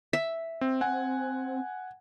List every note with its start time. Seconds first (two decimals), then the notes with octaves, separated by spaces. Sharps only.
0.13 E5
0.61 C4
0.81 C4 F#5 G#5